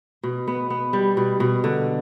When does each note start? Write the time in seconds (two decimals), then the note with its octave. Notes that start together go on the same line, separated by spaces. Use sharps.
0.23 B2
0.48 B3
0.70 B3
0.93 G3
1.17 B2
1.40 B2
1.64 D3